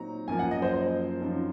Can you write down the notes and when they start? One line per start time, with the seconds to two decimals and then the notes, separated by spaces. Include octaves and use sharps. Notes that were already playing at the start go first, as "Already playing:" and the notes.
Already playing: A#2 F#3 C4 D#4 A#5
0.28 F#2 F3 A#3 G#5
0.39 F#5
0.51 D#5
0.62 C5
0.74 C5
1.20 F#2 F3 C4 D#4